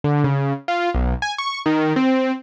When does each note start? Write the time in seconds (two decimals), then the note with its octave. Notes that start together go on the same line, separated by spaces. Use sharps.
0.04 D3
0.24 C#3
0.68 F4
0.94 B1
1.22 G#5
1.38 C#6
1.66 D#3
1.96 C4